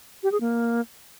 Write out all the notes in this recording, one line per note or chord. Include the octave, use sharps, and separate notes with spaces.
G4
G#4
A#3